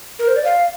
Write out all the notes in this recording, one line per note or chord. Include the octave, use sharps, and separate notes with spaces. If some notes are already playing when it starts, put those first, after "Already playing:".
A#4
C5
D5
F5